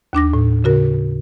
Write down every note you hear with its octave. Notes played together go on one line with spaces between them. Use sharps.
D#2 D4 D6 A#6
A2
C#3 F#4 A#4